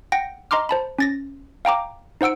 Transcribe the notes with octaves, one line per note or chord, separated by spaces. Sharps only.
F#5 G5 A#6
D#5 A#5 C6 D6 F6
C5 A5 B5
C#4 A6 A#6
F5 G5 A#5 D6
D#4 C5 F#5 E6 D7